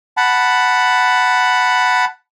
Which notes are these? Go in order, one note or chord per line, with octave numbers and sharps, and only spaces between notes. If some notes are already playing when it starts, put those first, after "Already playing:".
F#5 A5 B5